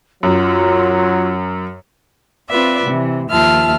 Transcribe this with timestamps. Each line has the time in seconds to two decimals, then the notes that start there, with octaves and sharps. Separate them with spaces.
0.23 F#2 F#3 F4
2.50 C4 F4 B4 D5 E5
2.86 C3 E3
3.31 D#2 F3 F4 E5 A5 F6